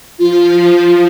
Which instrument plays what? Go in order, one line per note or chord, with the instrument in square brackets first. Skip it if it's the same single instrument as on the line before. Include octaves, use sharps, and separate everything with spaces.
[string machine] F3 [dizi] F4